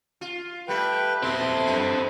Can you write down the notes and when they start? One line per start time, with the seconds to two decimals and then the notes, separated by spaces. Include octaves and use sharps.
0.21 F4
0.68 G3 A3 A4 B4 G5
1.22 A#2 C4 E4 A4 C6
1.66 F#2 B3